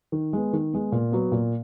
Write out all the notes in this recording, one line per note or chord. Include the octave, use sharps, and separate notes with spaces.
D#3
G#3 B3
D#3
G#3 B3
A#2
F#3 B3
A#2